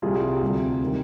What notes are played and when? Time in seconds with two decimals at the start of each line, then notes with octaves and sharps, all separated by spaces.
0.02 C2 C3 G3 F4 G#4
0.41 D2 C3 G3
0.83 D#3 G3